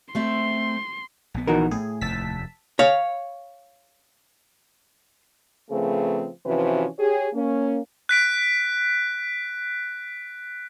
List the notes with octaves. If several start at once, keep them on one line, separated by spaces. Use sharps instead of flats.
A3 C4 E5 C6
A#1 B3
D#3 E3 F#4 A#4
A2 G#4
F1 D#2 A5 E6 B6
C#5 F5
C#3 F3 A3 C4 G#4 B4
C3 E3 F3 C#4 F#4 B4
G4 G#4 C#5
A#3 C#4
F#6 B6 D7